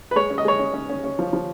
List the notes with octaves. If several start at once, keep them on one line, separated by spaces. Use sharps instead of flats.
B4
G#3 C#5
C#4
D#5
G#3 C#5
C#4
C#4
C#4
C#4
F3
F3